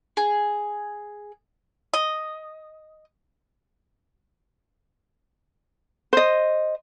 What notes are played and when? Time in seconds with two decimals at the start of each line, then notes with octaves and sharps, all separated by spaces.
0.17 G#4
1.93 D#5
6.13 C5 D#5